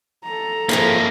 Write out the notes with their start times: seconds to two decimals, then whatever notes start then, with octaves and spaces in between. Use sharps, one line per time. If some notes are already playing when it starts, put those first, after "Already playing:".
0.24 A4 A#5
0.69 F2 G#2 F3 A#3 E4